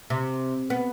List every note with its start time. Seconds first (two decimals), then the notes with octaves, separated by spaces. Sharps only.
0.10 C3
0.70 B3